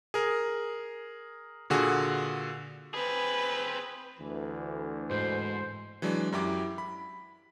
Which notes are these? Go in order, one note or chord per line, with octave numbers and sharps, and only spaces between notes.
G#4 A#4
A#2 D3 F#4 G#4
C4 G#4 B4
D2 E3
G#2 B2 C5
E3 F#3 G#3 D4
F#2 F#3 E4 G4 D6
B5